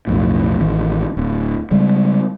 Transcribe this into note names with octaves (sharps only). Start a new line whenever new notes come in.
B1 F2 A2
A1 D#3
D1
C#3 G3 G#3